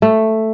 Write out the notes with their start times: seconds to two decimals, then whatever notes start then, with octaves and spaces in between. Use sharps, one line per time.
0.02 A3